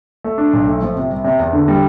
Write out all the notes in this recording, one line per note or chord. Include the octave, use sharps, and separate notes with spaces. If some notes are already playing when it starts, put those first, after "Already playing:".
A3
D4
B1
A3
F3
C3
C2
C3
E2
D3
G3